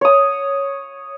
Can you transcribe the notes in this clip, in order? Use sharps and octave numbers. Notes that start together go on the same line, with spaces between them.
C#5 D#6